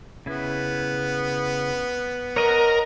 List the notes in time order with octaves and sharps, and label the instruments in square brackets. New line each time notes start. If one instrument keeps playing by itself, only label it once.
[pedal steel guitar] C#3 E4 [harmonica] B3
[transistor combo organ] A#4 [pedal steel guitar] C#5 D#5 F#5